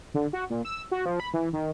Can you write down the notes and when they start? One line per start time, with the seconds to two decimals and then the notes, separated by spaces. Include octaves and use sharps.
0.14 D3
0.33 F#4
0.50 A#2
0.65 E6
0.91 F#4
1.06 F3
1.20 B5
1.34 E3
1.53 D#3